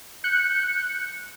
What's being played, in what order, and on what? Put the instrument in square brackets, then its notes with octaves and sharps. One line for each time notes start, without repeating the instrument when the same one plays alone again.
[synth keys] F#6 G6 C#7